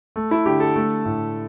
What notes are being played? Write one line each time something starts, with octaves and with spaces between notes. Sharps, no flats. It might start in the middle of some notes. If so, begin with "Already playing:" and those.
A3
E4
D3 G4
A4
A3
A2